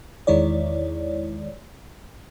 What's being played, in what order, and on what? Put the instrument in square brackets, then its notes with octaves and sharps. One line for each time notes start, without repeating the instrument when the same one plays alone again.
[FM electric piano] E2 D#3 G#3 E4 C#5 D5